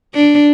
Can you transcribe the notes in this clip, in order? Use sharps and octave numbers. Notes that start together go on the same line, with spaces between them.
D4